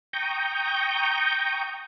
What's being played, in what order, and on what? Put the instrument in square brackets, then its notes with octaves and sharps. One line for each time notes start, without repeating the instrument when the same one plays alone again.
[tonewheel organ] G5 A#5 C#6 D#6 G6